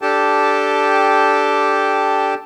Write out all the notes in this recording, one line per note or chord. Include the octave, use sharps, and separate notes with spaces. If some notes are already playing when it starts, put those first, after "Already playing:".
D4 G4 A4 G5 A5